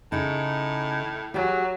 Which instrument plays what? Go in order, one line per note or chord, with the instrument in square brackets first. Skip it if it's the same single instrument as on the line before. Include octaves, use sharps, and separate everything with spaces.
[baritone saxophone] A2 [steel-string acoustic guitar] C#3 D#4
[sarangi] F#3 [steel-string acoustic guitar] G4 G#4